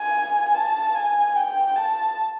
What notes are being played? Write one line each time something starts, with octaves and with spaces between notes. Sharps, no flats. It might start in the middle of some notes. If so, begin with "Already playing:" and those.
Already playing: G#5
A5
G#5
G5
A5